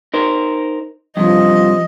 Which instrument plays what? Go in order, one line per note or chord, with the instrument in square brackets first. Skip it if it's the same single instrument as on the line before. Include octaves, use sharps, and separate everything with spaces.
[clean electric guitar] D#4 A#4 C5
[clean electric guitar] G2 C3 [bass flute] F3 [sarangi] D#5